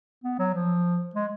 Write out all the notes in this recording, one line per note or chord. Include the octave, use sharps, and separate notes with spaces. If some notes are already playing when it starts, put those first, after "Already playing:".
B3
F#3
F3
G#3